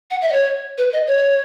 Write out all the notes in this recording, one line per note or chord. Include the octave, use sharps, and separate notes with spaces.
F#5
E5
D#5
C#5
B4
D#5
C#5